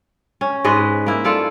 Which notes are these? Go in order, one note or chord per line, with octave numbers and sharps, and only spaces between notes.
C#4
G#2 G#3 B4 D#5
A#3 E4
F4 A4 D5 F5